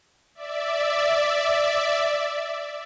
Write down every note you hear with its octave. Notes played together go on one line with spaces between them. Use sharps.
D5 E5